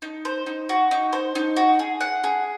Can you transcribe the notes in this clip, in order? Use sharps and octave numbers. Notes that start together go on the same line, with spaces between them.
D#4
C5
D#4
F#4
D#4
C5
D#4
F#4
G#4
F#5
G#4